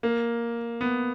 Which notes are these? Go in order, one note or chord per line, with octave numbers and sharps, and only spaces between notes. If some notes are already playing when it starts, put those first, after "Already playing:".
A#3
B3